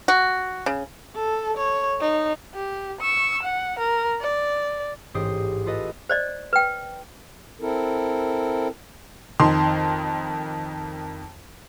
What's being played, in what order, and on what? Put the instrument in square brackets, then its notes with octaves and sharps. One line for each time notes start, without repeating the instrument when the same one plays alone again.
[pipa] F#4
C#3
[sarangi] A4
C#5
D#4
[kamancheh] G4
C#6 E6
F#5
A#4
D5
[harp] A1 G#2 G4 D#6 C7
F4 A4 B4 D#5
[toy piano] C5 D5 D#5
B4 G5
[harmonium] C4 E4 A4 A#4
[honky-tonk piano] F2 D#3 C6